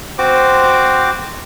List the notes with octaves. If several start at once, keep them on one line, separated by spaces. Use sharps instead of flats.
C4 F#4 C5 D6